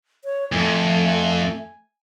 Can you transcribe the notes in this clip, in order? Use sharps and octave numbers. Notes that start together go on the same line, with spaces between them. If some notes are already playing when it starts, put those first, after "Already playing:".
C#5
F2 A3 G#5